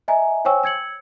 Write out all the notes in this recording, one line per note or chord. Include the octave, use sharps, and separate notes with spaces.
D#5 E5 G#5 A#5
C5 C#5 G5 G#5 C#6 E6
E6 G#6 C#7 F#7